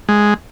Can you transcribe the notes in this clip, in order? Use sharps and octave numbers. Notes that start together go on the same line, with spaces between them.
G#3